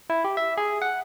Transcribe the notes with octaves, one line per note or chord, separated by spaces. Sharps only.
E4
G4
E5
G#4
F#5